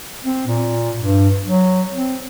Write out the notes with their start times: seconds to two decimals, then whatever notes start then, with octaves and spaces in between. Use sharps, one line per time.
0.24 C4
0.47 A#2
0.99 G2
1.46 F#3
1.92 C4